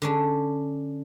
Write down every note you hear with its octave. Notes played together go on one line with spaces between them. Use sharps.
D3 C#4 D4